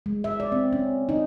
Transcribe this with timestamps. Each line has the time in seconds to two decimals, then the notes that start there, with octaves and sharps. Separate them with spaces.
0.06 G#3
0.24 E5
0.40 D5
0.52 C4
0.73 C#4
1.09 D#4